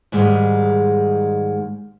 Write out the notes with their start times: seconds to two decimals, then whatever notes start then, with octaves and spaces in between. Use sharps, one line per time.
0.12 G#2 D#3 G3 G#3